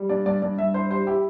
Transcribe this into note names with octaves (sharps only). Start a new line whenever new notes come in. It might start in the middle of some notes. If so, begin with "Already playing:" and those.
Already playing: G3
G2 D5
G2 D5
G2 D5
G2 E5
E4 C5
G3 C5
E4 G4